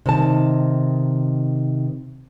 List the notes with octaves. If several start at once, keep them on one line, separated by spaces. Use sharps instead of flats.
C3 D#3 A5